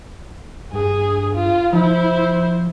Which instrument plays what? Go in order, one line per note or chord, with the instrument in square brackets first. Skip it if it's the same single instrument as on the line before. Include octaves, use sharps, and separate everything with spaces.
[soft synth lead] G2 [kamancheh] G#4
[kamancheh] F4
[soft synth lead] F3 [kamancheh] E4 C5